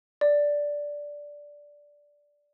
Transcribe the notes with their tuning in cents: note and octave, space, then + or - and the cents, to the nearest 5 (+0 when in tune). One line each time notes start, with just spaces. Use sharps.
D5 -5